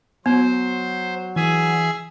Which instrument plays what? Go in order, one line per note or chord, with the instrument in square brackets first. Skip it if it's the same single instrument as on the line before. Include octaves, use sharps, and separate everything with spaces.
[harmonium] F#3 [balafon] B3 [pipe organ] C5
[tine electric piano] E3 [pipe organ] G#4 E5 G#5